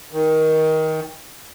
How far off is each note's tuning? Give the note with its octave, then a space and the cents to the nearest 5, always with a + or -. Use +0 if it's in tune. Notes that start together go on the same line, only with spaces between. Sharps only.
D#3 +20